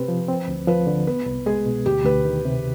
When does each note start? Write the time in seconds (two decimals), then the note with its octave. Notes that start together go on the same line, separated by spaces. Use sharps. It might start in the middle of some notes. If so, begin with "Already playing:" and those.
Already playing: C3 C4 G4 B4 C5
0.08 F3
0.28 C4
0.48 D2
0.68 F3 B4
0.87 D3
1.07 B3 B4
1.26 C2
1.46 G#3 G#4
1.66 B2
1.86 D2 G4
2.05 D2 B4
2.25 D#3
2.45 C3